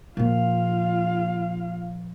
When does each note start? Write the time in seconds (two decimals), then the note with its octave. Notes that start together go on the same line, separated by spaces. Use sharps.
0.17 A#2 F3 F4 F5